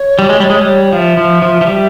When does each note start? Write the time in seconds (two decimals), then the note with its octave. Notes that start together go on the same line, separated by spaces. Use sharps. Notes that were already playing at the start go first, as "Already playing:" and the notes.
Already playing: C#5
0.19 G3
0.29 G#3
0.40 G3
0.50 G#3
0.61 G3
0.93 F3 E5 F5
1.17 F3
1.42 F3
1.61 F3
1.66 G3